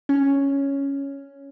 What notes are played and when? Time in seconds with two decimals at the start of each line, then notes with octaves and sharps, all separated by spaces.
0.09 C#4